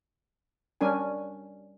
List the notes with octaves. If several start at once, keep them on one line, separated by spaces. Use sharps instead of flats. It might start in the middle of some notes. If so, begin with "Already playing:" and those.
G3 C#4 D4 A#4 G#5